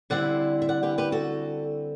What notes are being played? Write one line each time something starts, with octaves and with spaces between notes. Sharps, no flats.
D3 G3 C4 E4 D5 F#5
E5
D5 F#5
G4 B4
G4 B4
F#4 A4